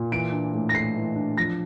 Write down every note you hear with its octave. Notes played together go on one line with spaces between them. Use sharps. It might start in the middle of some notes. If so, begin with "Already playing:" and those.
Already playing: A#2
E3 D7
D4
A2
A#6
A3 C7
E3
D4
F3 A#6